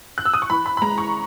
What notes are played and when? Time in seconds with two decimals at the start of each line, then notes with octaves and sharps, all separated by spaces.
0.18 F#6
0.25 E6
0.34 D#6
0.42 C#6
0.50 E3 B5
0.66 B5
0.77 B5
0.82 G#3 A#5
0.98 C#6